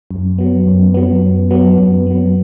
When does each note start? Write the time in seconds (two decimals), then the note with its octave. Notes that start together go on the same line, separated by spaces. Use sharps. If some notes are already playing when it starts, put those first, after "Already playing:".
0.11 F#2
0.38 F#3 B3
0.67 F#2
0.94 F#3 B3
1.23 F#2
1.50 F#3 B3
1.78 F#2
2.06 F#3 B3